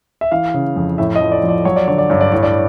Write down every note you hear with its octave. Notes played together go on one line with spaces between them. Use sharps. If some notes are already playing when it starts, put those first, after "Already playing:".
E5
E3 F5
C#3
F2
A2 E5
D#5
F3
D5
F3
D5
F#3 C#5
D5
D3 C#5
D5
G2 C#5
D5
A2 C#5
D5